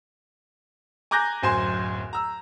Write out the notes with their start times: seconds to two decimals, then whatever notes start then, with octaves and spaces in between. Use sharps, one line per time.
1.11 G#5 A#5 D6 F#6 G6 A#6
1.43 D1 F#2 C5 G#5 C6 E7
2.13 A#5 E6